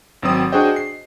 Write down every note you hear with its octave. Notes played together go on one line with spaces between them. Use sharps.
G#1 F#3 C4 D#6
D4 F#4 G#4 C5 D#5 G5
C7